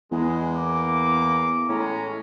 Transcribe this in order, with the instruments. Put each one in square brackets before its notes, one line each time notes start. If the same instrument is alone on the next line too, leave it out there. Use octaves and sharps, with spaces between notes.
[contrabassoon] E2 [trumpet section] G#3
[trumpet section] A#3 D6
[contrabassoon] A2 [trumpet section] G#3 C#4 A#5